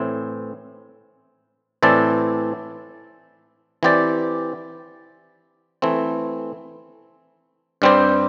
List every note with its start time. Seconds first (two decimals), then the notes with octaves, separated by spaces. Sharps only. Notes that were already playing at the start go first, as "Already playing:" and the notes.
Already playing: A2 E3 C4
1.83 A2 E3 C4 A4 D5
3.83 E3 C4 G4 D5
5.82 E3 A3 C4
7.82 G2 G3 C4 G4 C5